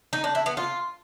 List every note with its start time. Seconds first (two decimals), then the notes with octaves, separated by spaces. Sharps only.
0.13 D#4
0.24 D4
0.35 E4
0.46 B3
0.57 F4